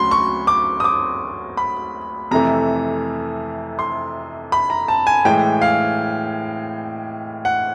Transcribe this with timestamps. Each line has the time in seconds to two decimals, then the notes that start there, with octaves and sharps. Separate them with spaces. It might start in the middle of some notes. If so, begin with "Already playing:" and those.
Already playing: D2 C#3 F#3 B5 C6
0.11 C#6
0.47 D6
0.80 D#6
0.84 D6
1.57 B5
2.31 F2 C3 E3 A3 A#5
3.79 C6
4.52 B5
4.70 A#5
4.88 A5
5.07 G#5
5.25 A2 E3 G#3 G5
5.62 F5
7.45 F#5